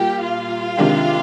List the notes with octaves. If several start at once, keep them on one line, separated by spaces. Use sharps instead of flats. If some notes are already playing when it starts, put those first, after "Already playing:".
Already playing: A#2 G3 A#3 G4 G5
F4 F5
C3 D#3 G#3 D4 G4